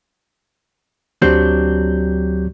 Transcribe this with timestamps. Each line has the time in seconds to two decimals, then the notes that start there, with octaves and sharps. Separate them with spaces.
1.22 D2 F#3 C4 D4 G4 G6